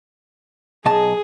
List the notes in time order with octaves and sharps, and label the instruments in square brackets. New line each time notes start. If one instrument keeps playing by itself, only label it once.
[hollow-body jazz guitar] B1 D#5 A5 [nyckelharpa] G#4